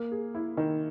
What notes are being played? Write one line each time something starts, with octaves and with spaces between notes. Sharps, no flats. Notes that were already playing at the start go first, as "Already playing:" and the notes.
Already playing: A#3
G#4
E4
D#3